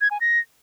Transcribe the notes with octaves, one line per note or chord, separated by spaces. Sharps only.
G#6
G#5
A#6